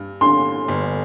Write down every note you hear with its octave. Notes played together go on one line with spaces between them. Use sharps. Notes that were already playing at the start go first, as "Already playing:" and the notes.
Already playing: G2
D3 C6
G1